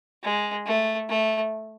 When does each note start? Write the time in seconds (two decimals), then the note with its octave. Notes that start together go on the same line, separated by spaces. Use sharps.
0.23 G#3
0.66 A3
1.09 A3